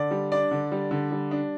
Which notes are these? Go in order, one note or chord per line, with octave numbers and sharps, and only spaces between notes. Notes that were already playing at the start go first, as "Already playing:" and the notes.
Already playing: D3 D5
G3
D4 D5
D3
G3
D3
G3
D4